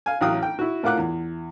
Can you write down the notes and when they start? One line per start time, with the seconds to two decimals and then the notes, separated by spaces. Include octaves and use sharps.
0.06 F5 G#5
0.21 A1 F#3 F5 G5 D#6 F#6
0.43 G5
0.59 E4 F#4
0.83 A2 F4 A#4 F#5 D6 F#6
0.97 E2